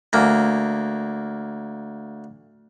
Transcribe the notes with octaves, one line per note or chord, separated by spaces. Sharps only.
D2 A#3